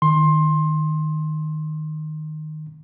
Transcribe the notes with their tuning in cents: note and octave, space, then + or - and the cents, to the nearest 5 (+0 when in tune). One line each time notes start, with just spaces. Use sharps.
D#3 -10 C6 +20